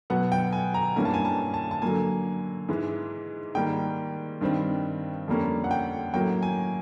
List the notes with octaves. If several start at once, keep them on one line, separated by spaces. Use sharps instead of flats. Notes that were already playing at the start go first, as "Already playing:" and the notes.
B2 F#3 B3 F#5
G5
G#5
A#5
G2 E3 G3 A#3 C#4 G#5
A5
G#5
A5
A5
A5
D3 F#3 A#3 G#5
G#2 E3 G#3
G#2 D#3 G3 A#3 G5
G2 D#3 G3 C4
F2 D3 G3 A#3 C#4
F#5
G5
A2 F#3 A#3 C#4 G5
G#5